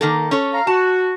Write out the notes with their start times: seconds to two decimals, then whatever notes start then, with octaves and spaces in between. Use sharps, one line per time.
0.01 D#3 A#3 A4
0.31 C#4 A4 C#5
0.53 F5 A#5
0.67 F#4 A5